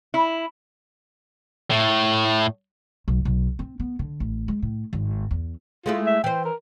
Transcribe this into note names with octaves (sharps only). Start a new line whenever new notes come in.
E4
A2
B1
B1
C4
B3
D3
A1
G#3
A2
G#1
E2
G#3 A3 E4 F4
E5
E3 C5 G5
A#4